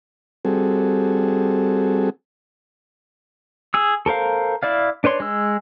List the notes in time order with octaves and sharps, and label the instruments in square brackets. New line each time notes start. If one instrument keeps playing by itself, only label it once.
[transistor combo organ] G3 C4 F#4 G#4 A4
[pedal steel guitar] G#4 E6
A4 A#4 C5 F5
E4 D5 F5
D4 B4 C#5 C6
G#3 E6